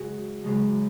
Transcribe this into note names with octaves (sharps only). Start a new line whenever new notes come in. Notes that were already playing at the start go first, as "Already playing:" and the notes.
Already playing: F#2 C#3 G#3 F#4 G#4
F#2 C#3 G#3